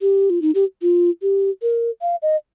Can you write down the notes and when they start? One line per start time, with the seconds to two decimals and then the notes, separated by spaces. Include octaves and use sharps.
0.02 G4
0.30 F4
0.42 D#4
0.55 G4
0.82 F4
1.22 G4
1.62 A#4
2.02 F5
2.22 D#5